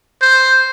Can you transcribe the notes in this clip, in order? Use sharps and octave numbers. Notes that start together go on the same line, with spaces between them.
C5